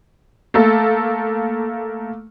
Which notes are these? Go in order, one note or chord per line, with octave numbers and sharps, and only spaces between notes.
A3 A#3 A4